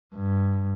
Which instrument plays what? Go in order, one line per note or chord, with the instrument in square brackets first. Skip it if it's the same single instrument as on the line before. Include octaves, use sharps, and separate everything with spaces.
[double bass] G2